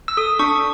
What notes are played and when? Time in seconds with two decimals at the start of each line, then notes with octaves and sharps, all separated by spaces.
0.08 E6
0.17 A4 D#6
0.39 D4 C#6